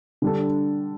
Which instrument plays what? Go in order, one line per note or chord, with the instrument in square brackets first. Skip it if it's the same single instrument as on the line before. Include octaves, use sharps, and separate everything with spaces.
[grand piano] D3 G3 D4 A4